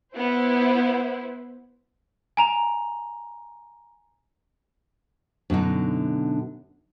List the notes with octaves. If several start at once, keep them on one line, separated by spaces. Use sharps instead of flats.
B3 E4 C5
G#5 A#5 F7
F#2 B2 D3 D#4